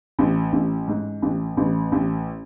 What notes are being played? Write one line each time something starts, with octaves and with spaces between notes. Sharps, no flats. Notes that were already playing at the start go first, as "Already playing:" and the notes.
A1
A1
G#2
A1
A1
A1